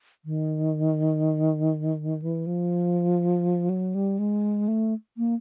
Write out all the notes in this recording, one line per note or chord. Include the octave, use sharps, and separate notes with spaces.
D#3
E3
F3
F#3
G3
G#3
A3
A#3